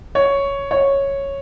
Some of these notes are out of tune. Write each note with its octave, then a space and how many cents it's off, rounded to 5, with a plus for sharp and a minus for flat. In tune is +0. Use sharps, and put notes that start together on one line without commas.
C#5 +5
C#5 -5